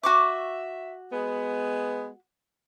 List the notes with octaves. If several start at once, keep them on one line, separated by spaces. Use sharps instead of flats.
F#4 E5 C#6 D6
G#3 B3